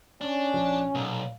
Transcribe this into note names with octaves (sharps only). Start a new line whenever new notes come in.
C#4 D4
A#1 F3
B1 A#2